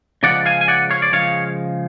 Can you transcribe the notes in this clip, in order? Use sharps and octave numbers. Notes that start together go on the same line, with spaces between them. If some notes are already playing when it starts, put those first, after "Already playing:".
C#3 F3 G#3 D5 F#5
F5 G#5
G#5
D5 F#5
C#5 F5
D5
C#3 F3 G#3 C#5 F5